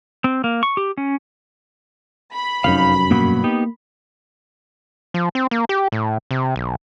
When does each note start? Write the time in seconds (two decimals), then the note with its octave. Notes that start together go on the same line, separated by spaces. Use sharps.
0.24 C4
0.44 A#3
0.63 C#6
0.77 G4
0.97 C#4
2.34 B5
2.64 F1 F#2 D#4 F5
3.11 G2 B2 F#3 A#3
3.44 B3 D#4 G4
5.14 F3
5.35 C4
5.51 A#3
5.69 G4
5.92 A2
6.31 C3
6.56 B1